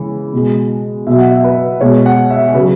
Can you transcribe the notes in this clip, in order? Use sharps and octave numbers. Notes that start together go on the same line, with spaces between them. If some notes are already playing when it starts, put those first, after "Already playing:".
Already playing: C#3 E3 G#3
B2 G#3
B2 F#3 E5
F#5
E5
B4
B2 G#3 C#5
F#5
E5
G#4
C#3 F#3 B4